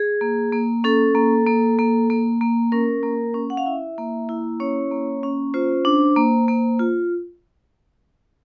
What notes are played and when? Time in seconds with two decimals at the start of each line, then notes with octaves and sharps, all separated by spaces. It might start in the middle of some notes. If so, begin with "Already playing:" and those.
Already playing: G#4
0.21 A#3
0.52 A#3
0.84 C#4 A4
1.15 A#3
1.47 A#3
1.79 A#3
2.10 A#3
2.41 A#3
2.72 C#4 A#4
3.03 A#3
3.34 C#4
3.50 F#5
3.57 F5
3.66 E4 E5
3.98 A#3
4.29 E4
4.60 C#4 C#5
4.91 A#3
5.23 C#4
5.54 F4 C5
5.85 D4
6.16 A#3
6.48 A#3
6.79 F4